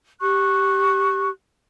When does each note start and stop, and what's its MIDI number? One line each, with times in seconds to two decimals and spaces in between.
0.20 1.28 67
0.20 1.28 85
0.20 1.28 90